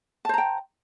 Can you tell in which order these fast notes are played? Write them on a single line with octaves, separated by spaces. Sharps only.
A5 C5 A#5 G5